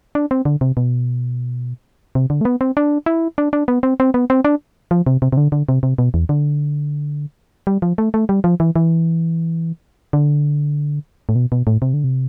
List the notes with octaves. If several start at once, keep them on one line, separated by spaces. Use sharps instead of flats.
D4
C4
D3
C3
B2
C3
D3
A3
B3
C4
D4
E4
D4
D4
B3
C4
C4
B3
C4
D4
F3
C3
C3
C3
D3
D3
C3
C3
B2
E2
D3
G3
F3
A3
A3
G3
F3
E3
E3
D3
A2
B2
B2
A2
C3
D3
C3